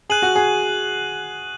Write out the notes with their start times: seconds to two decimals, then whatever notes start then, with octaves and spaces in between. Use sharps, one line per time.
0.10 G#4 F#6 D#7 F#7
0.22 F#4
0.35 G#4